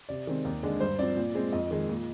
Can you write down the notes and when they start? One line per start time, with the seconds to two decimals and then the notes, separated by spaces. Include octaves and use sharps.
0.09 C3 D5
0.27 D#3 G#3 C4
0.45 D#2
0.63 D3 G#3 D4
0.80 G2 C5
0.99 F3 C4 D5
1.16 A#2
1.35 G#3 C4
1.52 F2 D#5
1.71 D#3 G#3
1.88 A#2